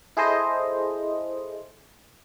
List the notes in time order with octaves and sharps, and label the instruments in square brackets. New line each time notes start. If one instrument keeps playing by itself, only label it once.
[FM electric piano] E4 G#4 A4 C5 D#5